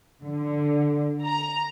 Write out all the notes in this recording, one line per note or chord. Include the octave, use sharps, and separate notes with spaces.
D3
A#5